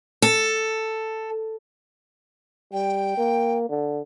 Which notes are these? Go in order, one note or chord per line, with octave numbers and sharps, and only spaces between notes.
A4
G3 G5
A#3
D3